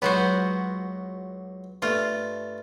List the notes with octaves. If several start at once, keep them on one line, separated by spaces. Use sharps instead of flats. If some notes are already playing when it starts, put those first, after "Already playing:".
C#2 F#3 B3 F#4 C5
G2 A3 F4